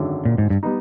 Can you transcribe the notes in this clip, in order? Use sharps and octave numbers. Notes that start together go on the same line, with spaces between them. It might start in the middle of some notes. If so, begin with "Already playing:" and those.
Already playing: G#1 F#2 D3 F#3
A#2
G#2
G2
G3 B3 D#4